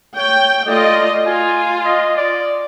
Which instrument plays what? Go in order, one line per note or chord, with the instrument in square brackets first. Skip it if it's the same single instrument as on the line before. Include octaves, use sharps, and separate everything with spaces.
[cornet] C#5 [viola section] G5
[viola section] A3 F4 D#5 [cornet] D5
[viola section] F4 [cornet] G#5
[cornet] D#5
D5